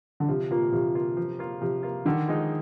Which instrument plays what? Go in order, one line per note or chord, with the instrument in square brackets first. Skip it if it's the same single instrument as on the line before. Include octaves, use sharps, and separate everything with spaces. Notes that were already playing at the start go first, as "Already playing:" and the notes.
[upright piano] D3
[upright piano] C3 [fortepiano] F3
[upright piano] A#2 [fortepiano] A#3 F4
[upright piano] C3 [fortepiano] F3
[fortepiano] A#3 F4
F3
A#3 F4
[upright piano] C3 [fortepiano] F3
[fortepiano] A#3 F4
[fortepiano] D3 [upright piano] D#3
[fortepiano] F3 G#3 D#4